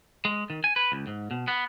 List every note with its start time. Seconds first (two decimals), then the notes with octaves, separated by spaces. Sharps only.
0.25 G#3
0.50 D#3
0.64 G#5
0.76 B4
0.92 C#2
1.07 G#2
1.31 B2
1.48 B3